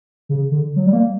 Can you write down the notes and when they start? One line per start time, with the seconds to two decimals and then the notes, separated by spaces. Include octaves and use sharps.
0.29 C#3
0.52 D3
0.76 F#3
0.86 G3
0.93 A#3